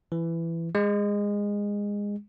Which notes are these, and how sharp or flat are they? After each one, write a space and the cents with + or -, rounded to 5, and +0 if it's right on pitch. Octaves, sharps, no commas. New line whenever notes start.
E3 +15
G#3 -20